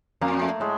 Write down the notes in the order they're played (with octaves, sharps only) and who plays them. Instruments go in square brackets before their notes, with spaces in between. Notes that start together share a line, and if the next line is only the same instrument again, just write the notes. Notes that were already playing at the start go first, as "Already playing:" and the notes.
[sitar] F2 [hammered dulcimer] A#3
[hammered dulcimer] A3
[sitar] A2 [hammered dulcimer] G#3